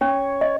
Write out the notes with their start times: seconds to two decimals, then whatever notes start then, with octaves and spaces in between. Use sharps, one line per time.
0.01 C#4 C#5
0.41 D#5